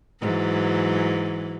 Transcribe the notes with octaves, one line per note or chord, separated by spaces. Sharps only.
G#2 E3 F#3